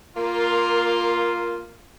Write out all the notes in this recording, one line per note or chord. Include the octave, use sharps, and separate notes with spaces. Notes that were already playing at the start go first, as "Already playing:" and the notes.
A#3 F4